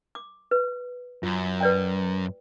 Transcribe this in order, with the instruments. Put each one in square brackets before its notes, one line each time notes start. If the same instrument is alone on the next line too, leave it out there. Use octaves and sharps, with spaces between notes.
[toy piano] D6
B4
[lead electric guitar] F#2 [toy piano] F4
[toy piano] B4 D5 G5